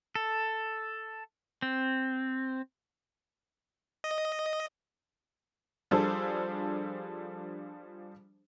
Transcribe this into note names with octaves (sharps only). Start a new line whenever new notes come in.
A4
C4
D#5
F3 G3 D4 G#4 A4 C5